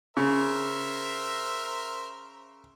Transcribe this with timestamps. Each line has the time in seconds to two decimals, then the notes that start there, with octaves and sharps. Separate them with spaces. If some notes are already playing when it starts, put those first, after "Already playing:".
0.17 C#3 A#4 C5 E5